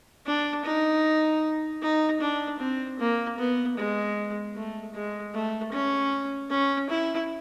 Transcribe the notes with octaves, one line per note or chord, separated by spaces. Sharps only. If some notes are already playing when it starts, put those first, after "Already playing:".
D4
D#4
D#4
D4
C4
A#3
B3
G#3
A3
G#3
A3
C#4
C#4
E4